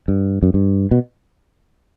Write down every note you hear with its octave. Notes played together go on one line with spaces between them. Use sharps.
G2
F#2
G2
B2